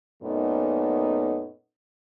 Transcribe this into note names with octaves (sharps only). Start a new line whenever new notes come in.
F#2 A#2 A3 B3 C#4 D#4